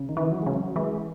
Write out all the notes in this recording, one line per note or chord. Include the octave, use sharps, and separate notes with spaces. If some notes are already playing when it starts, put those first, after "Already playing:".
Already playing: C#3
D#3
E3
F#3
C#3 G#3
F#3
E3 G#3